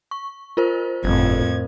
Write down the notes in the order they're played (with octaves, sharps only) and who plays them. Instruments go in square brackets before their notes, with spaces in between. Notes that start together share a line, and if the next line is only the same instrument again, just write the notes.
[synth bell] C#6
F4 A#4 C5
[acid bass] G1 [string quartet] F2 A2 G#6